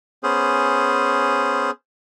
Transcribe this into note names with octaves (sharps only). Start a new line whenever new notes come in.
B3 C#4 G#4 C5